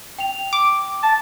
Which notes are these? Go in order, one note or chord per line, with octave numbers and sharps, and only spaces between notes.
G5 F7
D6
A5